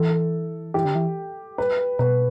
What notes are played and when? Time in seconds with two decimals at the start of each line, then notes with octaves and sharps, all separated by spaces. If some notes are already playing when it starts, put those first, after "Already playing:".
Already playing: E3 A4
0.74 E3 G4
0.85 D3
0.95 E3
1.58 B4
1.99 B2 B4